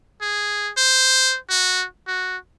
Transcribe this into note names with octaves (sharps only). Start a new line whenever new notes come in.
G#4
C5
F#4
F#4